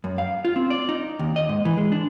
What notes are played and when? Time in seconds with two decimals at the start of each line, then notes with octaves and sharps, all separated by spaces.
0.04 F#2
0.18 F5
0.45 F4
0.56 C4
0.70 D5
0.89 D#4
1.19 D#2
1.36 D#5
1.49 G#2
1.65 E3
1.77 G#3
1.92 D4